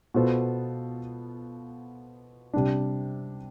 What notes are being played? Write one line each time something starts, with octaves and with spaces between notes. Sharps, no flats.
B2 B3 F4 A4 C5
C3 G3 D4